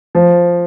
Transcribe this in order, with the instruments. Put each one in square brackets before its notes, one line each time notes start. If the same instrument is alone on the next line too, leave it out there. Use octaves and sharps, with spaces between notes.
[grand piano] F3